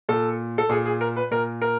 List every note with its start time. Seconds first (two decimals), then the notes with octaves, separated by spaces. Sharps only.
0.09 A#2 A4
0.58 A4
0.69 A#2 G#4
0.86 G#4
1.01 A#4
1.16 B4
1.31 A#2 A#4
1.62 A#4